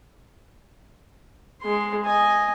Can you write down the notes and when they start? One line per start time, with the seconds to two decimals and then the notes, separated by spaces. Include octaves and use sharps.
1.62 G#3 C6
2.05 D#5 G#5